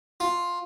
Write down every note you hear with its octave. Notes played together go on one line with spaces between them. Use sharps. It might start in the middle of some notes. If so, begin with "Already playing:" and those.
F4